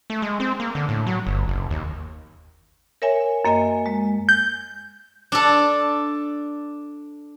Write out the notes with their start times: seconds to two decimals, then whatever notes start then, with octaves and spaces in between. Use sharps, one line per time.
0.10 A3
0.22 G#3
0.40 C4
0.60 A#3
0.75 D3
0.89 A2
1.07 F#3
1.27 G1
1.48 F#1
1.71 D#2
3.02 A#4 C#5 E5 G#5
3.45 F#2 A#3 D#5 G#5
3.86 G#3
4.29 G6
5.32 D4 A4